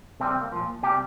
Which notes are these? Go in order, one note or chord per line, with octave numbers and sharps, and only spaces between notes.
C3 G3 C4
C4
A#3
A#2 F3
C3 G3 G4